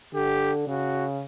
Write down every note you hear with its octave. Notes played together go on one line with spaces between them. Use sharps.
D3 G4
C#3 F#4